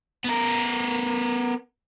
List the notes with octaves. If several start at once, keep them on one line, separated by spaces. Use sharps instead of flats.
B3 A#4